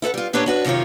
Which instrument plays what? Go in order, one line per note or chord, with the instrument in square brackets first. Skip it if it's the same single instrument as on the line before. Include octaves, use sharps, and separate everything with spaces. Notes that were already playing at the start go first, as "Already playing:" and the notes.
[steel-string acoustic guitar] E4 A4 B4 F#5
G3 F4
A#2 D4 G4 B4 C#5 F#5
D4 F#4 B4
F#2 C3 D#3 F4 C#5